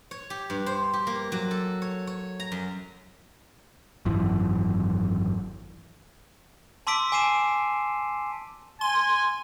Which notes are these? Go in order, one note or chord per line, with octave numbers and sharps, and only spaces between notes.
C#5
G4
G2
C5
G4
A#3
F#3
A4
C#5
C#5
A#5
F#2
G#1 F#2 E3
A5 C6 D6 E6 B6 D7
G#5 D6 C7 D#7 E7
G#5 C6